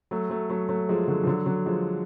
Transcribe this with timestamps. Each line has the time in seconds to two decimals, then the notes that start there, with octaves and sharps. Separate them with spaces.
0.11 F#3 A3
0.30 F#3 A3
0.49 F#3 A3
0.69 F#3 A3
0.89 F3 G#3
1.08 D3 F#3
1.23 F3
1.27 D3 F#3
1.46 D3 F#3
1.66 F3 G#3